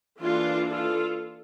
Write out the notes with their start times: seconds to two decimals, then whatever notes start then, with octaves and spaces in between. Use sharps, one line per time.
0.22 E3 A#3 D4 F4 A4
0.71 F4 A4